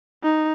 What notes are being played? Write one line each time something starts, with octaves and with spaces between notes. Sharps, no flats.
D#4